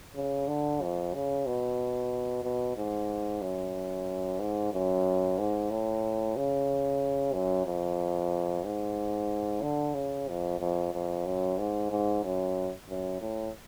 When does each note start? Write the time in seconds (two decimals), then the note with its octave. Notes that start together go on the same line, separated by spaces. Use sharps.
0.15 C#3
0.48 D3
0.82 F2
1.14 C#3
1.46 B2
2.44 B2
2.77 G#2
3.42 F#2
4.40 G#2
4.73 F#2
5.39 G#2
5.70 A2
6.36 C#3
7.33 F#2
7.66 F2
8.64 G#2
9.62 D3
9.94 C#3
10.28 F2
10.60 F2
10.93 F2
11.26 F#2
11.59 G#2
11.91 G#2
12.24 F#2
12.89 F#2
13.21 A2